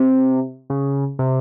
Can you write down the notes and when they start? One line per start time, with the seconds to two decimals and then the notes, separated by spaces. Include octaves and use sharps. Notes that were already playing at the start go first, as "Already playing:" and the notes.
Already playing: C3
0.70 C#3
1.19 C3